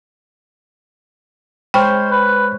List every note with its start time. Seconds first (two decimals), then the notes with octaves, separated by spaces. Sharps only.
1.74 G#3 C5 C#5 G5 B5 C#6 F6
2.09 B4